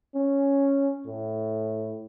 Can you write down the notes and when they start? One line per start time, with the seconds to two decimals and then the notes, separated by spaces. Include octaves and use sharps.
0.15 C#4
1.06 A2